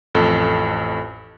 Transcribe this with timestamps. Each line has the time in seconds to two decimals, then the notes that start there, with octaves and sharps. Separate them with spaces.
0.15 A1 F2 A4